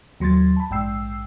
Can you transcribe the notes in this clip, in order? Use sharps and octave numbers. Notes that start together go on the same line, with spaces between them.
D#2 F#3 C6 G#6 A6
A5 B5
A#1 G#2 G5 E6 C7